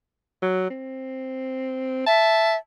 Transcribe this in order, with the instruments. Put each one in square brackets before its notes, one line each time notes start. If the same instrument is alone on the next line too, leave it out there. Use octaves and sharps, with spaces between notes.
[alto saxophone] F#3
C4
[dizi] E5 [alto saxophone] A5